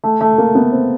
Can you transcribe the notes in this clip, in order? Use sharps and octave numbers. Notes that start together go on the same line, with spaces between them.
A3
A3
A#3
B3
C4